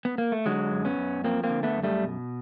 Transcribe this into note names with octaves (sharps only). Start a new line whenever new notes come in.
B3
A#3
A3
D3 F#3 G#3
F#2
B3 C#4
F#2
F3 A#3 C4
A#3 C4
D3
A3 B3
F#2
G3 A3
B2